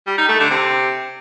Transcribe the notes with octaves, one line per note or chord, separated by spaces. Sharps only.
G3
D#4
A3
D3
C3